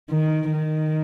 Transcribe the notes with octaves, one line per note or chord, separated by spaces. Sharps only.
D#3
D#3